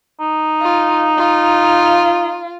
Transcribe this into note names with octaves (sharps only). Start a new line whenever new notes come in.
D#4
F4
F4